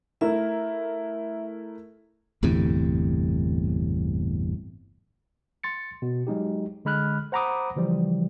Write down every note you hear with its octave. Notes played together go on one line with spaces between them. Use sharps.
A3 E4 A#4 E5
G1 E2 A2 C3
C6 A6 C#7
B2
F#3 G#3 D#4 G4
D3 G#3 B5 F6 F#6
C5 F#5 A#5 B5 D6 D#6
C#3 E3 F3 G3